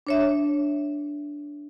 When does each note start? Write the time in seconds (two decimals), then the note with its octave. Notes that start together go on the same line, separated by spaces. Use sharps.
0.07 D4 C#5 E5